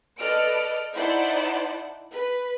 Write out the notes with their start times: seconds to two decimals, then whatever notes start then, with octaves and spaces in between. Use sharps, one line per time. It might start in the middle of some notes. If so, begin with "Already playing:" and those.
0.18 A4 B4 D5 D#5 F6 D7
0.94 D#4 E4 C5 D5 F#5 A5
2.12 B4